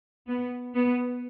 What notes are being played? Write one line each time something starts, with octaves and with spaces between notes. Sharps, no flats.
B3
B3